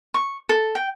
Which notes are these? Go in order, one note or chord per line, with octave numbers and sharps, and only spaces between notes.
C#6
A4
G5